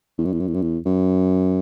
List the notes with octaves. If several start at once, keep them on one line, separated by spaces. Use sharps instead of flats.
E2
F#2
E2
F#2
E2
F#2
E2
F#2